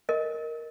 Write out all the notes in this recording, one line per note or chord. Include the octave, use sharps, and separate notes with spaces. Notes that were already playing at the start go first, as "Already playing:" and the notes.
A#4 D#5